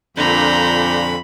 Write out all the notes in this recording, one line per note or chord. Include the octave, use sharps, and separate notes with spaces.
F2 A#2 D3 A#5 B5 G6